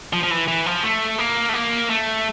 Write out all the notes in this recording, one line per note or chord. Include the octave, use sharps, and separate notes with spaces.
F3
F3
E3
E3
F3
A3
A#3
A3
A#3
A3